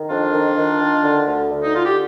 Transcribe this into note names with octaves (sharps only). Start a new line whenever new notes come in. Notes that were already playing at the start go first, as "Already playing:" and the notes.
Already playing: D#3
F2 D4 F4
D#3
D#3
D#3
D3
D2
D3
D#4
D3 F4
G4